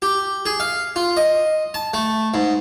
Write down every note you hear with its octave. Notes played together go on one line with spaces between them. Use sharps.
G4
G#4
F5
F4
D#5
A5
A3
G#2